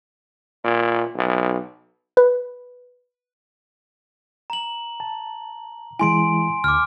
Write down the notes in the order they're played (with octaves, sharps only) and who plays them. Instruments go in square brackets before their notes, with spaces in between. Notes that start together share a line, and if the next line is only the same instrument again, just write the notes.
[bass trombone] A#2
B1
[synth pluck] B4
[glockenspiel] A#5 F#7
[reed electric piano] A5
[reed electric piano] E3 G#3 E4 [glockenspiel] G#5 C6 D7
[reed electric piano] D2 [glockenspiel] D6 F6